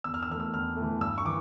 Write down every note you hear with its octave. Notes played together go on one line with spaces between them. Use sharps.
E2 E6
F6
E6
E3 A3 F6
E6
E2 F6
E3 A3
G2 E6
C#6
E3 D6